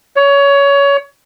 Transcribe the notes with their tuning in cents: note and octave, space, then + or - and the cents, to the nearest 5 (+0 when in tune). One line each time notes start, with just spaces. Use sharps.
C#5 +20